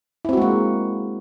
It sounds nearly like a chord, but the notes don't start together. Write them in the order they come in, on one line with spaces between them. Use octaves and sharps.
E4 C4 F#4 G#3 A#3